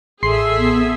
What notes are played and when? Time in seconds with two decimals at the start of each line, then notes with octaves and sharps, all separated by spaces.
0.23 A1 G#4 A4 E5 C6 C7
0.58 B3